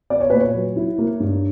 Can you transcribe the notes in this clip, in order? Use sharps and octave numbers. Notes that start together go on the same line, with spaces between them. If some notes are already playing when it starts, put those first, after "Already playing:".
B3 D5
C#5
A#2 B4
C#5
F#3
E4
A#3
G2